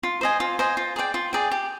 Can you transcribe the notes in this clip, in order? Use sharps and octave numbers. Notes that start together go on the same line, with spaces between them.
F4
C5 D#5 G#5
F4
C5 D#5 G#5
F4
G#4 D5 G5
F4
G#4 D5 G5
G4